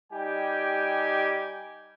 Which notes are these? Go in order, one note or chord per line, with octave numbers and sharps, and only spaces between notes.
G3 D#4 G4 G5 G#5